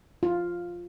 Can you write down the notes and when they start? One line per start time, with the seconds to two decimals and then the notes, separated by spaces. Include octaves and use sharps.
0.23 F4